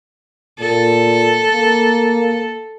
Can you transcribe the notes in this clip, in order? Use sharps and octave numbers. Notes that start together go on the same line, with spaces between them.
A#2 A4
A#3